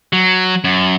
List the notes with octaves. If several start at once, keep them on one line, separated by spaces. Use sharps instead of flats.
F#3
F#2